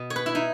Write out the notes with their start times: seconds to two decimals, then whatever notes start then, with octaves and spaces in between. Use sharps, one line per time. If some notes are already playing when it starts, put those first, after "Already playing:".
Already playing: B2 D#5
0.10 C#5
0.16 B4
0.26 E4
0.35 D#4